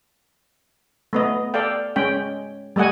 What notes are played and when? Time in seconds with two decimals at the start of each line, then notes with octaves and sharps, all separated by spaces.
1.13 A3 B3 D#5
1.54 A4 D5 F5 G5
1.96 G#3 C#4 G5
2.76 G3 A3 D#5 F#5 G#5